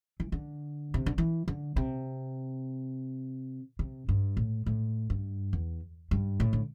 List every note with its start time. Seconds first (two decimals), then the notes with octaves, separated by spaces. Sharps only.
0.20 E3
0.32 D3
0.94 C3
1.06 D3
1.18 E3
1.48 D3
1.76 C3
3.79 C3
4.09 G2
4.37 A2
4.66 A2
5.10 G2
5.53 E2
6.11 G2
6.40 A2
6.53 D3